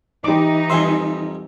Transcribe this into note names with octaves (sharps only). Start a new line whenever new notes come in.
E3 D#4 G4 D6
F2 G3 E5 G#5 C6